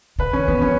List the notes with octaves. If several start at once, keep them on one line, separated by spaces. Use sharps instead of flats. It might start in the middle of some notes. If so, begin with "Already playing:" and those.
C#3 B4
D#3 C#4
E3 B3
F#3 C#4